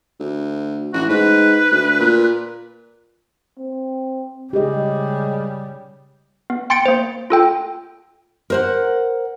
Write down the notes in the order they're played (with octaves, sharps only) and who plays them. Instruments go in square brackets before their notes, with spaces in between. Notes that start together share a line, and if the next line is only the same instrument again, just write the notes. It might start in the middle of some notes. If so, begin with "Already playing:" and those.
[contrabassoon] D2
[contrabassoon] A1 [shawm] F#4
[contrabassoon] G#2 [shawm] B4
[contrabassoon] D2
A#2
[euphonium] C4
[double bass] C#3 G3 [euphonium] G#3 [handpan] G4 G#4 D#5
[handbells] B3
G5 C6 A6 C#7 D7
A#3 C5
F4 A4 G5
[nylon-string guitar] A#4 C5 F#5